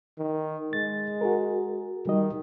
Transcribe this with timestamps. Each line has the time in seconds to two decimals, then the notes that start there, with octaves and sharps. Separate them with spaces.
0.18 D#3
0.73 G#3 A6
1.21 F#4 G#4 A#4
2.07 D#3 G3 D#5